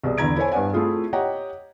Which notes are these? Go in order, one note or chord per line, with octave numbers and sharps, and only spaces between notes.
C2 B2 G#4 D5
E2 D3 E4 A#5 G#6 D7
E4 A4 C5 C#5 G#5
G2 B3 D5 F#5 G#5
A3 C4 E4 F4 G#4
G4 C#5 D#5 F#5 G5 A#5